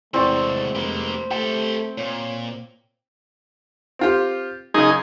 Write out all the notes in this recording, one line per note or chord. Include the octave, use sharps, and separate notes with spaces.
E2 A2 C3 G#3 C4 D5 C#6
F1 A#3 G4
A3 G4 A4 G5
A#2 C#5
C4 F4 G4
F#2 C#3 D#4 G#4